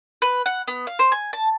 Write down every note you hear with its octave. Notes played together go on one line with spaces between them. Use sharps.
B4
F#5
B3
F5
C5
G#5
A5